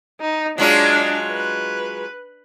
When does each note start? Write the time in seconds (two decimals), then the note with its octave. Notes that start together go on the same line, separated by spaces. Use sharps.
0.21 D#4
0.58 F#3 G#3 D4 F4
1.31 B4